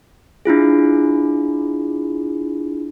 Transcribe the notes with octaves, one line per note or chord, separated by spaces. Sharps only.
D4 E4 F4 G#4